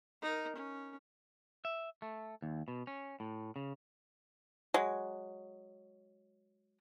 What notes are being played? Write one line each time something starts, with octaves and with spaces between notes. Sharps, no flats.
D#4 A#4
C#4
E5
A3
D#2
B2
C#4
A2
C#3
F#3 G#3